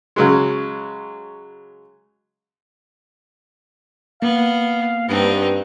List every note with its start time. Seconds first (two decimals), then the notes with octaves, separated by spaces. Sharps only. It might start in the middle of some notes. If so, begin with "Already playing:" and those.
0.16 C#3 F#3 G#3
4.22 A#3 B3 F5
5.09 G2 B3 C4 D#4